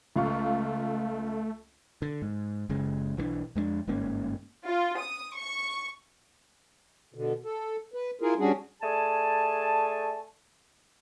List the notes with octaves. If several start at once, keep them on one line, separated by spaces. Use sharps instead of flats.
C#2 A3 F4 C#6
D3
G#2
F#1 C#3 G#3
B1 E3 G3 D4
F2 G#3 A#3 D4
G1 G#2 A#3 C#4
F4
D#6
C#6
B2 D3
A4
B4
E4 F4 G#4 A#4
G3 C#4 D4 F#4 G#4
A3 G#4 D5 G#5 A5